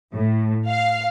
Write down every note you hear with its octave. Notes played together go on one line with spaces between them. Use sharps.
A2
F5